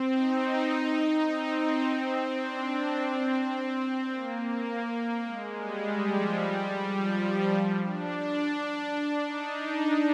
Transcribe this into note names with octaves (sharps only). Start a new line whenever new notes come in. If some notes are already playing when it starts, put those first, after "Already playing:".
Already playing: C4
D#4
C4
C4
C4
D4
C4
A#3
G#3
G3
F3
G3
F3
F3
D4
D#4